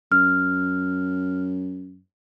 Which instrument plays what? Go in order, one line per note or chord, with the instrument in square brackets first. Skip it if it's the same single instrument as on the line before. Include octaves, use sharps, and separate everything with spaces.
[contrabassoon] F#2 [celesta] F6